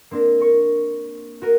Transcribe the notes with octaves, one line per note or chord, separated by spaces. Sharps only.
A#3 C4 D4 A#4
A#4 C#6
F#4 A#4 D#7